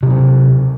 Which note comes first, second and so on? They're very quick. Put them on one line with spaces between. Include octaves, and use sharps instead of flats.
C3 F#3 C4